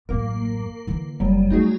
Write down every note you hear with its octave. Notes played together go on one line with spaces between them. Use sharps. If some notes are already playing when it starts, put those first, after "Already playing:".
A1 F#2 A#3 A#4
D3 E3
F#1 F#3 G3
A3 D#4 F4 F#4 G#4